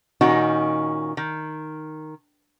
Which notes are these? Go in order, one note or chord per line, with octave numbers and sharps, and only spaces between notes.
A#2 D#3 C#4 D#4 F#4
D#3